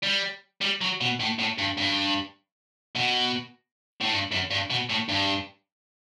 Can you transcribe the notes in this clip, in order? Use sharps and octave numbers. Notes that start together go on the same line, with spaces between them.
G3
G3
F#3
B2
A2
A2
G2
G2
B2
A2
G2
F#2
G2
B2
A2
G2